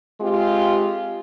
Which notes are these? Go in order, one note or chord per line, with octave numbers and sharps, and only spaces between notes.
G#3 C4 F4 G4